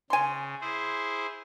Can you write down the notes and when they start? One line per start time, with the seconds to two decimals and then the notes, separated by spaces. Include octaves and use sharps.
0.10 C#3 G#5 C6
0.61 E4 G#4 C5